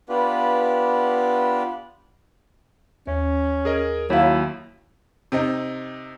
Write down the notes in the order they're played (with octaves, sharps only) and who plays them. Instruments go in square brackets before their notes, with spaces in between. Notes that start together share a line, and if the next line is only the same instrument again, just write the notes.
[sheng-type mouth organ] B3 D4 F4 G4 B4
[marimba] D#2 [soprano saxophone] C#4
[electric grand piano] G#4 A#4 D#5
[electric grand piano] D#2 [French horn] F#3 [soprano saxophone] E4 [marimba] C#5 F5
[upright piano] C3 C4 D#4